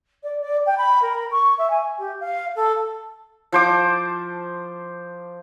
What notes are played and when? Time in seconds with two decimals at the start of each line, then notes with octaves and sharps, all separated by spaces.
0.23 D5
0.41 D5
0.66 G5
0.77 B5
1.02 A#4
1.31 C#6
1.58 E5
1.70 G#5
1.98 G4
2.20 F5
2.55 A4
3.52 F3 C5 D6